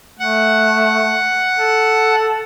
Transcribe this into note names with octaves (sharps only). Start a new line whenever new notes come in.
A3 F#5
A4